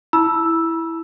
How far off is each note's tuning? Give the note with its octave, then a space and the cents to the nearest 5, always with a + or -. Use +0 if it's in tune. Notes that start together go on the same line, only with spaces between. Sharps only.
E4 +0 B5 -40 E6 +0